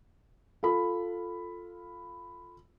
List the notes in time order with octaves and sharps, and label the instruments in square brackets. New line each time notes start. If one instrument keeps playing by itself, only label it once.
[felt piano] F4 A4 B5